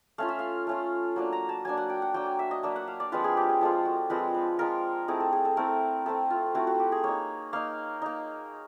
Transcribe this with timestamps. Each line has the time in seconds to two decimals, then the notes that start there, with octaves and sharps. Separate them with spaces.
0.18 A3 C#4 F4 F5
0.28 E5
0.39 F5
0.67 A3 C#4 F4
1.16 F#3 A#3 D4
1.33 A#5
1.49 A5
1.65 F#3 A#3 D4 G#5
1.77 F#5
1.90 G5
2.02 F#5
2.14 F#3 A#3 D4 G5
2.26 G#5
2.39 E5
2.51 D#5
2.63 F#3 A#3 D4 E5
2.76 F#5
2.88 F5
3.00 D5
3.12 F3 G#3 C4 F4 B4
3.24 G#4
3.37 G4
3.49 G#4
3.61 F3 G#3 C4 F4 A4
3.85 F#4
4.10 F3 G#3 C4 F4 B4
4.34 B4
4.59 F3 G#3 C4 F4 A#4
5.08 A3 C4 E4 G#4
5.20 A4
5.33 G#4
5.45 A4
5.57 A3 C4 E4 A#4
6.06 A3 C4 E4 A4
6.30 F4
6.55 A3 C4 E4 F#4
6.67 F#4
6.80 G4
6.92 G#4
7.03 A#3 D#4 C#5
7.53 A#3 D#4 F5
8.02 A#3 D#4